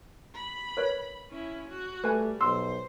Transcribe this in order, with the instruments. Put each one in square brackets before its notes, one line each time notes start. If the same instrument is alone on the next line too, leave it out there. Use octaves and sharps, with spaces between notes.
[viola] B5
[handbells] A#4 B4 C#5
[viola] C#4 E4
F#4
[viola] G3 [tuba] A3 [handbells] B4 G#5
[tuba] B1 [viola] C5 [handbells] C6 E6